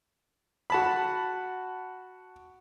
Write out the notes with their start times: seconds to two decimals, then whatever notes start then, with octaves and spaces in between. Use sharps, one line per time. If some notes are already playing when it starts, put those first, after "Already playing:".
0.70 F#4 A5 B5